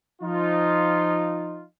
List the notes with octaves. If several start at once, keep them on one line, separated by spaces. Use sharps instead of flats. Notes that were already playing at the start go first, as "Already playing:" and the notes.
F3 D#4 F4